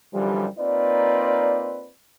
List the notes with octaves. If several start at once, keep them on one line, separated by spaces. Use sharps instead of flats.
F#2 D3 E3 F3 G3
A#3 C4 D#4 F4 B4 D5